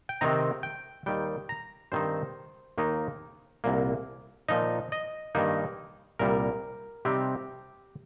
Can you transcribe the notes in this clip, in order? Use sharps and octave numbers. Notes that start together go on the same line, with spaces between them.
G5
C3 D#3 C4 D#4 A#5
G5
D#2 D#3 G3 G5
A#5
G2 D#3 C4 D#4 C5
D#2 D#3 A#3 D#4
C2 A#2 A#3
A#2 F3 D#4 D#5
D#5
G2 D#3 A#3 D#4
C2 A#2 G3 A#4
C3 G3 C4 D#4 G4